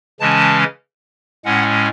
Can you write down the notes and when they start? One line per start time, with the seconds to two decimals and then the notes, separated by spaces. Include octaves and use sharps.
0.20 C#3 E3 G#3 C#4 A5
1.45 A2 G#3 C#4 F#5